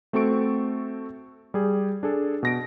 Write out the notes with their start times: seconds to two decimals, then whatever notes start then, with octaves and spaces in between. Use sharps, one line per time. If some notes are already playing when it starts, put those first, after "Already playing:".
0.13 A3 C4 F#4 A4 C#6 D7
1.54 G3 G#4
2.03 D4 G#4 A4
2.43 B2 A#6 D7